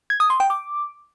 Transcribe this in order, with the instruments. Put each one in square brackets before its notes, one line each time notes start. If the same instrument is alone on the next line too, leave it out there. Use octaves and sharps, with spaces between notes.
[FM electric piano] G#6
D#6
C6
G5
D6